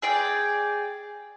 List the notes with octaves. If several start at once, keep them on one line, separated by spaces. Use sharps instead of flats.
G#4 D5 G5